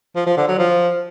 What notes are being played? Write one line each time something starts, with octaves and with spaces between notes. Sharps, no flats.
F3
F3
D3
F#3
F3